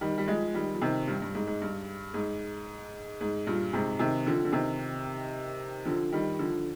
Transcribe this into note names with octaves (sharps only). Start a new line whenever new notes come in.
D#3 G3
G3
F3 G#3
D#3 G3
F3
C3 D#3
G2
G2
G#2
G#2
G2
G#2
G#2
G2 A#2
G#2 C3
C3 D#3
D3 F3
D3
C3 D#3
D3 F3
D#3 G3
D3 F3